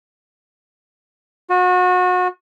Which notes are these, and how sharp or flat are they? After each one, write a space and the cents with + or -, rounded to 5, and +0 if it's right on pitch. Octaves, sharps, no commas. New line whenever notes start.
F#4 -30